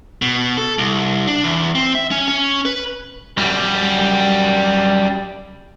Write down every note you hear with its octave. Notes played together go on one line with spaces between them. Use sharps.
B2
A4
C2
D4
E2
C4
E5
C#4
C#4
B4
F#2 G3